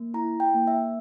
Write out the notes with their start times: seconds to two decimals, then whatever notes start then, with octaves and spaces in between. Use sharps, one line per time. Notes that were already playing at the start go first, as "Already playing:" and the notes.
Already playing: A#3
0.14 E4 A#5
0.40 G5
0.54 A#3
0.67 E5